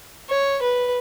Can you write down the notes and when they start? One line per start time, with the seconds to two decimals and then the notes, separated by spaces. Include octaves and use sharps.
0.30 C#5
0.62 B4